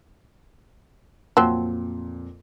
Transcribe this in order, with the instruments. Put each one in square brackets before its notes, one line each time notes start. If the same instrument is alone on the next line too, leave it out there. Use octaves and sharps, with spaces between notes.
[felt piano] F2 A#2 [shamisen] F3 F#3 C4